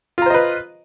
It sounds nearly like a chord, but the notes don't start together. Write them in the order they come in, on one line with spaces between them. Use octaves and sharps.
F4 A#5 C5 D#5 B4